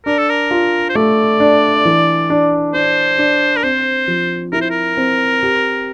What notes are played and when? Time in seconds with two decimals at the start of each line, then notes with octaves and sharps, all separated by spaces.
0.06 D4 A#4
0.18 A4
0.30 A#4
0.51 F4
0.89 C5
0.95 A3 D5
1.40 D4
1.85 E3
2.30 D4
2.74 D4 C5
3.18 D4
3.56 A#4
3.63 C4 C5
4.08 F3
4.53 E4 A#4
4.62 C5
4.70 A#4
4.97 C4
5.43 G4